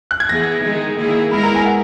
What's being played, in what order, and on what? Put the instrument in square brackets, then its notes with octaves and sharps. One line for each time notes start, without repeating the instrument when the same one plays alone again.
[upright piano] F#6
G#6
[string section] E3 B3 E4 G#4 [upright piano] A#6
[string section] D#3 G#3 D#4 G#4
D#3 A#3 E4 G#4
[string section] G#3 B3 E4 A#4 [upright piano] B5
[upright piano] A#5
G#5
F#5